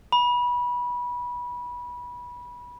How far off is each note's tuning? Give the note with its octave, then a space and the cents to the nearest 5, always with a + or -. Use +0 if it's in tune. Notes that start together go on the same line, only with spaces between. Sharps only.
B5 -20